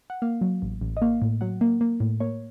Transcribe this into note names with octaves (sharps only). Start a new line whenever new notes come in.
F#5
A#3 F5
F#3
A1
A1
D#5
A#3 F5
A2
F#3 F#5
A#3
A#3
A2
A#3 C#5